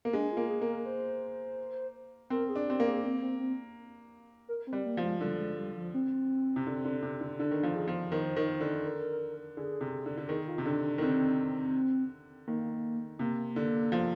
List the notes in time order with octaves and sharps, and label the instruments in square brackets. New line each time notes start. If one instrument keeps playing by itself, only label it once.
[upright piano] A#3
[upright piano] G#3 [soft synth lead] D4
[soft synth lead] F4
[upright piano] A#3
[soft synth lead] G#4
[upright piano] A#3
[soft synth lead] A#4
C5
[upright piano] C4 [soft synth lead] A#4
[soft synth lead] G#4
[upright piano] D4
[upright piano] C4 [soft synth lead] G4
[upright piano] A#3
[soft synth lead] G#4
C4
C4
C4
A#4
C4
[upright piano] G3
[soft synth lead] A#3
[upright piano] F3
[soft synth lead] G#3
[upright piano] D3 [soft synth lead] G3
[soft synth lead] G#3
G3
F3
C4
[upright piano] C3
D3
D3
C3
D3
[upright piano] D3 [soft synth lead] D4
[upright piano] D#3
[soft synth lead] D4
[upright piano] F3
[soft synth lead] G#4
[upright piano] F3
[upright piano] D#3 [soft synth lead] C5
[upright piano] D#3
D3
[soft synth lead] A#4
[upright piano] D3 [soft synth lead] G#4
[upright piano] C3
D3
D3
[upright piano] D#3 [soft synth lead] G#4
[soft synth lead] F4
[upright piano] C3
[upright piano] D3 [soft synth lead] D4
[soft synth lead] D4
[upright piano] D#3
[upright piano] D3 [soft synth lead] C4
[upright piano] D#3 [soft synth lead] A#3
[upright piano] C3 [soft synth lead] A#3
[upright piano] D3
F3